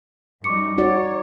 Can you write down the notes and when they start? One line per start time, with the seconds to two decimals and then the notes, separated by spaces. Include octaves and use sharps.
0.44 F#2 G3 D#4 C#6 D6 C#7
0.78 D#4 F#4 C#5 D5